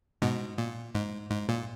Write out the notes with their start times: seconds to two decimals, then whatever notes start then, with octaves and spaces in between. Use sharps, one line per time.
0.22 G#2 B2
0.58 A#2
0.95 G#2
1.31 G#2
1.49 A#2